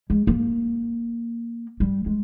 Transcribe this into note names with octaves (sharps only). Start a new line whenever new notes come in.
G#3
A#3
G3
G#3